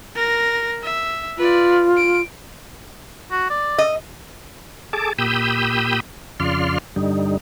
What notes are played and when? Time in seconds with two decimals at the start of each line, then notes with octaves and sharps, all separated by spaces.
0.16 A#4 A#6
0.83 E5
1.38 F4 B4 D5
1.97 D7
3.32 F#4
3.50 D5
3.78 D#5
4.93 G#4 A4 A5 D6
5.18 A#2 G4 B5 D#6 E6 G6
6.40 F2 C#3 F4 D5 C6 F6
6.96 G2 D3 G3 D#4